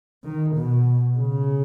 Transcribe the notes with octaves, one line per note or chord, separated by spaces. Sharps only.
D#3
B2
C#3